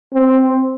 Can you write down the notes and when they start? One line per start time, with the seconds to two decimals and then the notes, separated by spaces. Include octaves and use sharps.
0.14 C4